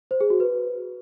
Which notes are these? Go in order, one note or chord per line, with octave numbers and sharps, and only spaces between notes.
C5
G#4
F#4
B4